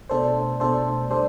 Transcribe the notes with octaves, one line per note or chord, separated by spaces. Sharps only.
B2 A3 D4 A4 C5
B2 A3 D4 A4 C5
G3 D4 A4 C5